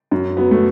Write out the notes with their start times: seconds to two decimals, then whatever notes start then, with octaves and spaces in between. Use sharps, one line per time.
0.11 F#2
0.37 F#3 B3
0.51 A3